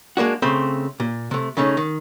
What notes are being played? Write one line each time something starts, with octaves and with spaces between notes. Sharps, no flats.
G#3 A#3 D4 F#4
C#3 A3 C4 C5
A#2
C3 A3
C#3 A3 C#4 D#4
D#3